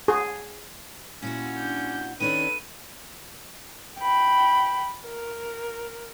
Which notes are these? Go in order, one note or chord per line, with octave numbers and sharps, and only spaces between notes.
G#4
A#2 C#4 E4 F#4
D4 G6
D#3 C#4 D4 A4 B4 D#7
G5 B5
A#4